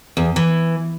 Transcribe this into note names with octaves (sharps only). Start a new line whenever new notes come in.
E2
E3